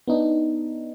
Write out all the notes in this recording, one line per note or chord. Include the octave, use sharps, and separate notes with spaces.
B3 D4 D#4